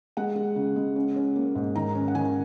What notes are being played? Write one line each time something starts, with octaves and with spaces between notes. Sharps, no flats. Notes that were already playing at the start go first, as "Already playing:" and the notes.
G#3 F#5
G#3
C#3
G#3
C#4
C#4
A#3
G#2
D#3 A#5
C#4
F#5
D#3 G#5